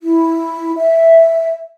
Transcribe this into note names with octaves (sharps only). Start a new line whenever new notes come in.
E4
E5